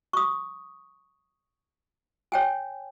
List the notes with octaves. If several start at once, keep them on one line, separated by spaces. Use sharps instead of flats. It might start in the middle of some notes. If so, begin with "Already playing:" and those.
C#6 D#6
C#5 G5 G#5